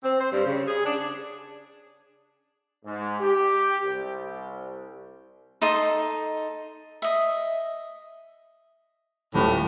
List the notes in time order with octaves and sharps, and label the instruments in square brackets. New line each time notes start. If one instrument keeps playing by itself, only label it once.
[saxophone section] C4
C5
G2
C#3
G#4
D4
[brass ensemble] G#2
G4
C2
[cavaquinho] D#4 A4 D#5 C6
D#5 E5
[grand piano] D#1 A3 [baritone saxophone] A2